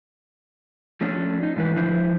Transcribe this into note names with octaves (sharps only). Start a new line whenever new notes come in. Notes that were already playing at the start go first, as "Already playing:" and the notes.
F3 A3 C#4 D4
D#4
G#2 E3 B4
D3 F3 E4 B4 C5